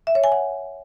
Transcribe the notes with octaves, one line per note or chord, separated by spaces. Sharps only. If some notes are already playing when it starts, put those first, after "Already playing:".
E5
C#5
G#5
F#5